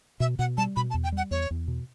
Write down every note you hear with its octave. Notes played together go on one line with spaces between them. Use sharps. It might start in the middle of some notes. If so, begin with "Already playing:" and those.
B2 E5
B2 F#5
G3 A5
B2 B5
A5
E2
G5
G3 F#5
E2 C#5
E2
B2